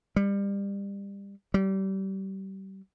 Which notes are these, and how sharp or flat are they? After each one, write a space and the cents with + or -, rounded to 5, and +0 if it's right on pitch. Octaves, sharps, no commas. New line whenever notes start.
G3 +25
G3 -30